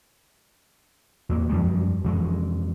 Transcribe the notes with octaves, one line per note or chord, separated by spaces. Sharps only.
E2 A#3
F#2 F3 G3 G#3
F2 E3 G#3